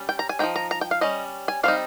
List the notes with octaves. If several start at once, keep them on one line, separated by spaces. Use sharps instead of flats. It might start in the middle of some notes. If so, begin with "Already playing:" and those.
Already playing: G3 C#4
G5
A#5
G#5
F3 C4 D#4 G5
A#5
A#5
G5
F5
G3 C#4 D#5
G#5
G3 C4 D#4 F5